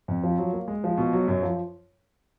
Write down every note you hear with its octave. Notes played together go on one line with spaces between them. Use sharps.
F2
F3
F#3
A#3
G#3
F3
B2
F#3
F#2
F3